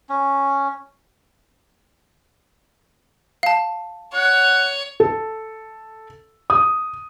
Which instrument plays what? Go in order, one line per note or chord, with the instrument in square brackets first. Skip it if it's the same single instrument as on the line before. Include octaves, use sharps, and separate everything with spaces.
[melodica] C#4
[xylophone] F5 A5
[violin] C#5 [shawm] F#5
[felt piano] A4
D#6